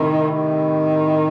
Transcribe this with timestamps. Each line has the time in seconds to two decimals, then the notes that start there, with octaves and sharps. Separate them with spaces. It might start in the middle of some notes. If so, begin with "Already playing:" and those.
Already playing: A2 C3 D#3
0.30 D#3